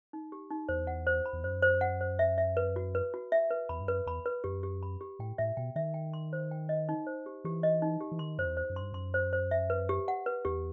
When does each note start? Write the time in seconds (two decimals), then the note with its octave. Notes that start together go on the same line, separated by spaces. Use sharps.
0.13 D#4
0.32 G4
0.50 D#4
0.69 E2 C5
0.87 F#5
1.07 C5
1.26 B5
1.33 E2
1.44 F#2 C5
1.62 C5
1.81 F#5
2.01 C5
2.19 E5
2.38 E5
2.57 B4
2.76 F#4
2.95 B4
3.14 F#4
3.32 E5
3.51 B4
3.69 E2 B5
3.80 G2
3.88 F#2 B4
4.06 E2 B5
4.26 B4
4.44 F#2 G4
4.63 G4
4.83 B5
5.01 G4
5.19 A2 G5
5.38 A2 E5
5.57 B2 G5
5.76 D#3 E5
5.94 G5
6.13 C6
6.33 C5
6.51 G5
6.69 D#5
6.89 D#4
7.07 C5
7.26 G4
7.44 E3 G4
7.63 D#5
7.82 D#4
8.01 G4
8.12 E3
8.19 D#3 C6
8.39 F#2 C5
8.45 E2
8.57 C5
8.70 F#2
8.76 G2 C6
8.93 F#2 C6
9.14 C5
9.33 C5
9.51 E5
9.70 B4
9.89 G4
10.08 F#5
10.26 B4
10.45 E2 G4